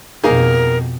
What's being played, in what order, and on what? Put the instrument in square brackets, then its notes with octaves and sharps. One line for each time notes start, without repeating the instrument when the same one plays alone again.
[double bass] F2 B2 [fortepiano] A#3 D#4 G#4 [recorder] A#4